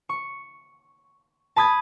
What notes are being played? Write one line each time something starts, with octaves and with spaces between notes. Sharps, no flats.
C#6
A5 B5 D#6 G#6 A6